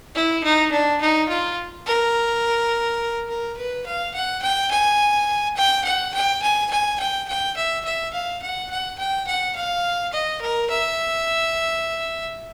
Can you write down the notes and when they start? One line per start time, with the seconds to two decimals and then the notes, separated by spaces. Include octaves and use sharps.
0.15 E4
0.44 D#4
0.72 D4
1.01 D#4
1.29 F4
1.86 A#4
3.28 A#4
3.57 B4
3.86 F5
4.14 F#5
4.42 G5
4.71 G#5
5.57 G5
5.85 F#5
6.14 G5
6.42 G#5
6.71 G#5
7.00 G5
7.28 G5
7.57 E5
7.85 E5
8.13 F5
8.42 F#5
8.71 F#5
8.99 G5
9.27 F#5
9.56 F5
10.13 D#5
10.41 A#4
10.70 E5